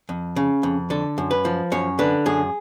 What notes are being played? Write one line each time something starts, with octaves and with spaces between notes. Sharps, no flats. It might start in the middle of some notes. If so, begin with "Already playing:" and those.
F2
C#3
F2
D3 A4
F#2
B4
F3
F#2 C#5
D3 B4
F#2 G#4